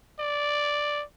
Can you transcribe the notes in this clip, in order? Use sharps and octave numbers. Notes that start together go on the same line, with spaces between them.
D5